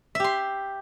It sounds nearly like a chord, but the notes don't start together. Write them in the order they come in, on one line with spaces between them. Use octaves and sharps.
E5 G4 C6